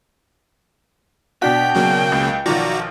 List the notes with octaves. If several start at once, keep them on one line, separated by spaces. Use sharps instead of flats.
B2 D4 F#4 G5 B6
C#3 F#3 A#3
C#2
B1 D#3 F3 F#4 D5 A#5